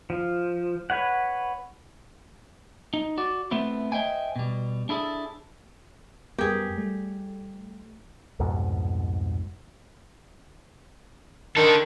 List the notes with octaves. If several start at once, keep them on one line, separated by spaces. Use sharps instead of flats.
F3
B4 C#5 F#5
D#4
F#4 D5
A3 B3 C4 E4
C5 D#5 E5 G5 G#5
B2 G3
D4 E4 G#4 A4
F#2 G3 B3 G4 G#4 A#4 G5
G3 A3
C2 F2 G#2 B2
D3 D#3 A4